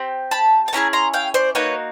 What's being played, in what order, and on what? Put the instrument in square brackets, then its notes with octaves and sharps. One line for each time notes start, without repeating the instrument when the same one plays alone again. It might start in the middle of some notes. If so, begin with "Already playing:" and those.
Already playing: [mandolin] C4 G4
A5 B5
A5
A3 C#4 E4 G#4 G#5 A#5
A#5 C6
F5 G5
C5 D5
A#3 D#4 F#4 B4 C#5